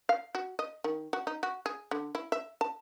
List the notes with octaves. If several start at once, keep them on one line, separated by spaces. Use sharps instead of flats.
F5
F#4
D#5
D#3
F#4
D#4
F#4
G#4
D3
E4
E5
A5